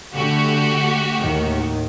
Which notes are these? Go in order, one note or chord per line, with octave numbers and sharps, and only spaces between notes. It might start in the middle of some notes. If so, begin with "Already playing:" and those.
D3 A3 F#4 G4
D#2 A2 D#3